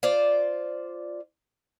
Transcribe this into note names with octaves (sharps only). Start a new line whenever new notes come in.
F4 C5 D5